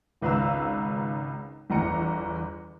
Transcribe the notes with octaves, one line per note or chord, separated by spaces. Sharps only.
G#1 C#2 B4 F5 A#5 E6
G1 E2 A#5 C#7